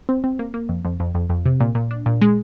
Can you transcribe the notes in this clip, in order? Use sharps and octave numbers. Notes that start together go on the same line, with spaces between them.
C4
C4
A#3
A#3
F2
F2
F2
F2
F2
C3
A#2
A#2
D4
A#2
G#3